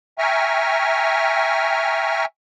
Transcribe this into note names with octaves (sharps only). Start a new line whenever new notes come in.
E5 G5 G#5 A#5 C#6 F6